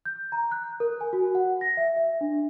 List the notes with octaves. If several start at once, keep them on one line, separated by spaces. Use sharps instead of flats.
G6
A#5
F#6
A#4
G#5
F#4
F#5
A#6
E5
E5
D4